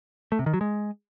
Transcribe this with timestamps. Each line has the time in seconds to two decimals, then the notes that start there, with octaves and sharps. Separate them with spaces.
0.32 A3
0.39 C3
0.46 D#3
0.54 F#3
0.61 G#3